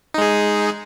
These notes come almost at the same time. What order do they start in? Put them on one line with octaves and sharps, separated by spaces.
D#4 G#3 G#4